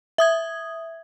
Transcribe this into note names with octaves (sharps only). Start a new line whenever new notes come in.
E5 D#6 G#6